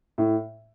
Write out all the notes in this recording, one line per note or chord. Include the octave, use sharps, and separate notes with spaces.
A2